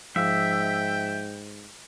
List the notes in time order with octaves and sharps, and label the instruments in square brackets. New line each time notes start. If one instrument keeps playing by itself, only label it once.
[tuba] G#2 [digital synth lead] F3 [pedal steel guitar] E5 [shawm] G5